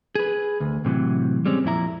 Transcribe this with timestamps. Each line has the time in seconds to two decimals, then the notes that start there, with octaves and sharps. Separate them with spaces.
0.15 G#4 B4
0.60 D2
0.85 A2 C3 E3 F#3
1.46 G3 G#3 C4 C#4
1.64 F2 A#2 E4 A#5